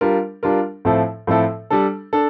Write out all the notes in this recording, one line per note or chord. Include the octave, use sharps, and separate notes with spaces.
G3 D4 F4 A#4
G3 D4 F4 A#4
A2 F3 C4 E4 A4
A2 F3 C4 E4 A4
G3 D4 A4
D4 A4